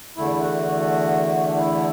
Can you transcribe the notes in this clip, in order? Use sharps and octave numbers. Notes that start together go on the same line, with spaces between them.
E2 D3 A3 E4
F#4
D4
E4